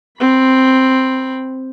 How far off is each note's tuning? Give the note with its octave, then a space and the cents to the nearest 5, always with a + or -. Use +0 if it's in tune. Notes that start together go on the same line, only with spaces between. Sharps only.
C4 +0 B5 -15